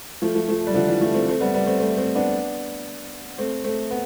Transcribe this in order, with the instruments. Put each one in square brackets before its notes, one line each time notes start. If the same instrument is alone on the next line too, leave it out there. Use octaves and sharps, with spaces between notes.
[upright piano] F3 A3
F3 A3
F3 A3
G3
D3 F3
E3 G3
F3 A3
A3 C4
A3 C4
G3 B3
G3 B3
A3 C4
A3 C4
A3 C4
B3 D4
A3 C4
A3 C4
B3